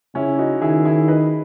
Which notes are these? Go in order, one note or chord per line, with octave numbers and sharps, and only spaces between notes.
C#3 C#4 E4
D#4 F#4
D#3 E4 G#4
E4 G#4
B4 D#5